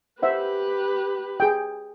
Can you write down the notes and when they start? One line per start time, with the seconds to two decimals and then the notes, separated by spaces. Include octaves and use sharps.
0.23 G4 B4 C5 E5 F#5
1.40 G#4 G5